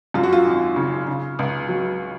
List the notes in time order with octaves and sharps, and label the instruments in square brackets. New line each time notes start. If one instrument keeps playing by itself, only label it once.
[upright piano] F#2 F4
F#4
F4
G#1
C#3
C#3
C#2
F#3